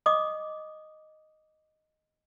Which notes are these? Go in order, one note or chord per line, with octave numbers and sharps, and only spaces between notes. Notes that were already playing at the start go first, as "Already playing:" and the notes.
D#5 D6 D#6